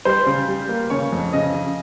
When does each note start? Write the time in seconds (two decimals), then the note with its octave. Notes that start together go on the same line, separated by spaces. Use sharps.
0.05 G3 C5
0.26 C#3
0.48 G3
0.69 A#3
0.90 C#3 C#5
1.12 F2
1.33 C#3 D#5
1.54 C#3